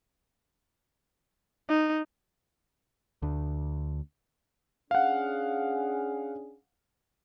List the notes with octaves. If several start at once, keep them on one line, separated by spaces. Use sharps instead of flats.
D#4
D2 D4
C#4 D4 G#4 F5 F#5